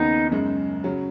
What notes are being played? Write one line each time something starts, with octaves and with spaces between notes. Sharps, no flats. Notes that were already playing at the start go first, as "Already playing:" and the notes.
Already playing: D#2 C#3 B3 D#4
F#2 C#3 G#3
C#3 F#3